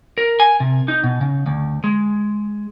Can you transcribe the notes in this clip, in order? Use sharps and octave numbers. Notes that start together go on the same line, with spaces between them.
A#4
G#5
C3
D#4
B2
C#3
D2
G#3